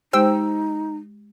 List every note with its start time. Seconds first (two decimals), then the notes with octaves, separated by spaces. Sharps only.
0.13 G#3 D#4 G4 C5 G5 E6